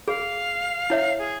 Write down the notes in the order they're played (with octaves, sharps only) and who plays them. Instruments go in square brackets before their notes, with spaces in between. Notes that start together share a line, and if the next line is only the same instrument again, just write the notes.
[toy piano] G#4 [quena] F5
[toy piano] E4 C#5 E5
[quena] G#4